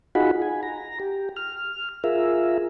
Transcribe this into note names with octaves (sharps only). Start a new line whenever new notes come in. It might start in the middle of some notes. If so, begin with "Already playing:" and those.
D#4 F4 F#4 G#4 F#5 B5
G#5
A#5
G4
F6
F4 G#4 A#4 E5